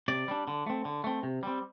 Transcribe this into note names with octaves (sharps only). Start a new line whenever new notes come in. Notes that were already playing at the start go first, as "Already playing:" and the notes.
C3 D5
G3 D4
D3
A3 C4
D3
A3 C4
C3
G3 C4